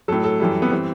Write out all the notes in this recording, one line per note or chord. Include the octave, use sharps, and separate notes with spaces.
A2 F#3 A4
A4
F#2 E3 G3
B3
E3 G3 C4